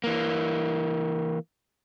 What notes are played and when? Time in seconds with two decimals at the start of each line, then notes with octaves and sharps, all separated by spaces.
0.04 E3 A#3